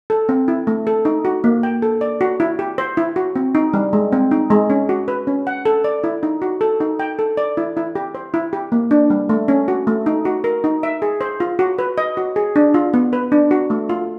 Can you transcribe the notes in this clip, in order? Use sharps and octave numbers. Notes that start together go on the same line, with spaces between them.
A4
C4
E4
A3
A4
D#4
F#4
A#3
G5
A4
D5
F#4
E4
G4
C5
E4
F#4
C4
D#4
G3
G#3
C4
D#4
G#3
C#4
F#4
B4
C#4
F#5
A4
D5
E4
D#4
F#4
A4
D#4
G5
A4
D5
E4
E4
G4
C5
E4
G4
A#3
D4
G3
A3
C#4
F#4
A3
D#4
F#4
A#4
D#4
E5
G#4
C5
F4
F#4
B4
D#5
F#4
G#4
D4
F4
B3
B4
D4
F#4
A3
F4